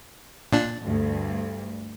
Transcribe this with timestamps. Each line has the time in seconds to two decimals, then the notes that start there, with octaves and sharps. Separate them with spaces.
0.53 A#2 D4
0.83 D2 G2